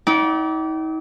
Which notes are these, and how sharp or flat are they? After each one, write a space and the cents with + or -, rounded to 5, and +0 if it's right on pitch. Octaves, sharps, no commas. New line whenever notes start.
D#4 +40 D5 -20 G5 -40